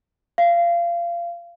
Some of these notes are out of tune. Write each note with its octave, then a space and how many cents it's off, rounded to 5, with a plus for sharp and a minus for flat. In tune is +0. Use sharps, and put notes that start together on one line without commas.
F5 -25